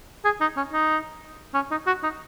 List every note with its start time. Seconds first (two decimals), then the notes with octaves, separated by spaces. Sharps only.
0.25 G#4
0.41 D#4
0.57 C#4
0.73 D#4
1.54 C#4
1.71 D#4
1.87 F#4
2.03 D#4